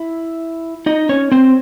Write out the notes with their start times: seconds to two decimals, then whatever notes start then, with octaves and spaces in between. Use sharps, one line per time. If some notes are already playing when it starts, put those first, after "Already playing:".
Already playing: E4 E5
0.86 D#4 D#5
1.09 C#4 C#5
1.32 C4 C5